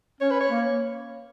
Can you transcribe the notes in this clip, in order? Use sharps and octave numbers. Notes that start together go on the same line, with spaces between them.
C#4 C#5
B4
C#5
A#3